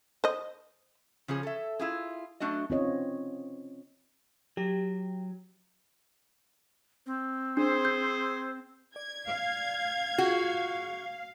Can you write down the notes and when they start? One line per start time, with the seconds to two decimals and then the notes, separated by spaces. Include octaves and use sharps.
0.24 C5 D#5
1.28 C#3 F3 C#4 G#4
1.43 A4 E5
1.79 E4 F4 G#4
2.40 F#3 A3 D4 F#4 D#5
2.70 C4 C#4 F4 C#5 D#5
4.57 F#3 G4
7.06 C4
7.57 D4 G#4 C5
7.85 G6
8.96 D5 G#6
9.24 F5
10.18 F4 F#4 G#4